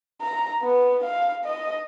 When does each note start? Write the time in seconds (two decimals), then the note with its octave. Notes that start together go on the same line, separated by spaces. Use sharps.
0.21 A#5
0.62 B3
1.04 F5
1.45 D#5